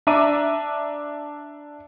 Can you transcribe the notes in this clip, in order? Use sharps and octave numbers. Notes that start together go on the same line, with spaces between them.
D4 E5 A#5 D6 D#7